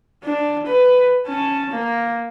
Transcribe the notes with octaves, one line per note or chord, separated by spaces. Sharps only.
D4
B4
C#4 A5
A#3